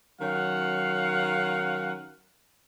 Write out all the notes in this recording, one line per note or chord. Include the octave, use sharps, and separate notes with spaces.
D#3 F#3 C#4 F5 F#5